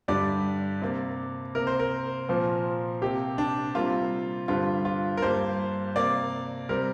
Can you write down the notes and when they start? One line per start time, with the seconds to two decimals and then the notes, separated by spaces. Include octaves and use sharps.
0.08 G2 D3 G3 D5
0.82 C3 A#3
1.55 C3 A#3 A#4
1.67 C5
1.80 A#4
2.28 A#2 F3 C4
3.01 C3 A#3 G4
3.38 D4
3.75 C3 G3 A#3 F4
4.48 G2 D3 G3 C4 F4
4.85 F4
5.17 A#4
5.22 G2 G3 A#3 C5
5.96 C3 A#3 D5
6.69 C3 G3 C4 A#4